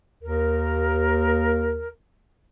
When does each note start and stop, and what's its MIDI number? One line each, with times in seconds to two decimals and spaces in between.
0.23 1.89 39
0.23 1.89 70